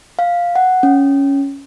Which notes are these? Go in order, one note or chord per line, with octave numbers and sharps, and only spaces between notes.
F5
F#5
C#4